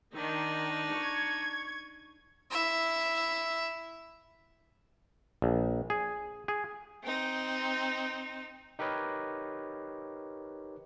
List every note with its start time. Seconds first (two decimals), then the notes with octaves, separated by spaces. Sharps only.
0.13 D#3 D4 D#4
0.94 C#6 G#6
2.51 E4 E5
5.42 A#1
5.90 G#4
6.48 G#4
7.03 C4 D#4
8.79 D#4 G4 A#4 B4 C#5 D#5